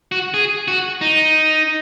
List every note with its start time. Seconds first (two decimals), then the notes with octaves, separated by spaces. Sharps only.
0.12 F#4
0.34 G#4
0.68 F#4
1.01 D#4